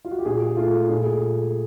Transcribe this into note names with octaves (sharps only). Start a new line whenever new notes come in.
F4
F#4
G4
A#2 G#4
A3 F4
A#2 G#4
G#4